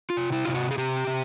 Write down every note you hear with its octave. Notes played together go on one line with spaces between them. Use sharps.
F4
C3
E4
C3 F4
F#4
G#4
C3 G4
C3